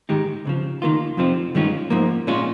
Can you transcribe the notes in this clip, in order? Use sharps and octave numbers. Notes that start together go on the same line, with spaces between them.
G#2 D#3 G#3 D#4 G4
C#2 C#3 F3
D#2 D#3 A#3 F4
F2 C3 F3 C4 F4
G2 D#3 G#3 C#4 F4
G#2 F3 A#3
A#2 G#3 C#4 F4